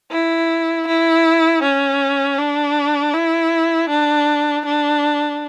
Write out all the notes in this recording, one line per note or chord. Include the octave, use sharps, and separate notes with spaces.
E4
E4
C#4
D4
E4
D4
D4